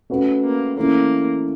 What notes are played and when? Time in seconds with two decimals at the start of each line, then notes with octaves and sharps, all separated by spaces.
0.10 A3 C#4 F#4 B4
0.43 A#3
0.76 E3 A3 A#3 C#4